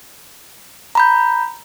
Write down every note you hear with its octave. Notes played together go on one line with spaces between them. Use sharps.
A#5 B5 G6